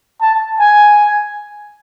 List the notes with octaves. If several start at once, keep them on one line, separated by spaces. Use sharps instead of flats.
A5
G#5